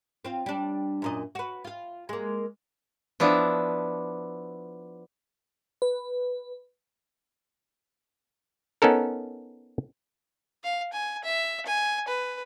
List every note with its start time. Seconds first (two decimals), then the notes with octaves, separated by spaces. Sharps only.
0.25 C4 F4
0.46 G3 D4
1.02 F#2 A#2 D#5
1.35 F#4 B4
1.64 F4 F5
2.09 G#3 A#3
3.20 F3 B3 D4 E4
5.82 B4
8.82 B3 C#4 D#4 A4 A#4
10.64 F5
10.93 G#5
11.25 E5
11.66 G#5
12.08 B4